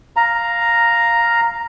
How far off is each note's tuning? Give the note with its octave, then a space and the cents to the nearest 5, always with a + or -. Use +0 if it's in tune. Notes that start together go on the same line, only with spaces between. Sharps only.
F5 +0 A#5 +0